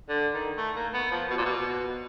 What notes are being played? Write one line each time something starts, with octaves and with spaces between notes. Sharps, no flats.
D3
D#3
A3
A#3
B3
F3
B2
A#2
B2